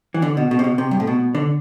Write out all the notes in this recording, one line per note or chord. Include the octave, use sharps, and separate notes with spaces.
E3
D3
B2
B2
C3
B2
C3
G2
A2
B2
D3